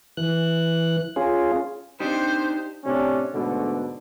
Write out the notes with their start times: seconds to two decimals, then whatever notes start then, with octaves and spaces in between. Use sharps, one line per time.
0.17 E3 F#6
1.16 C#4 F4 G#4
2.00 C4 D4 D#4 G4 C5
2.85 A2 C3 C#4 D4
3.32 G#2 B2 D3 A3